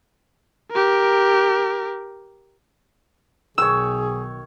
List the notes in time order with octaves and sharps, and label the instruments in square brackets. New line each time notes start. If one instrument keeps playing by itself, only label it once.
[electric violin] G4 A#4
[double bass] B1 [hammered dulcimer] D#3 C#5 [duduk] G#4 [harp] E6